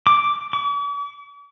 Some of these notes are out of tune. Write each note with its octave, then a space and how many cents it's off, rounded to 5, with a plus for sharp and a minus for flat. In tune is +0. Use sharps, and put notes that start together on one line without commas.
D6 -5
D6 -45